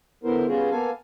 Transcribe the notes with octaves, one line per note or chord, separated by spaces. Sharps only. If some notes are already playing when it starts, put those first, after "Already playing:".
D3 B3 E4 A#4 C5
G3 B3 C#4 F4 F#4 G#4
A#3 B3 A4 F5 G#5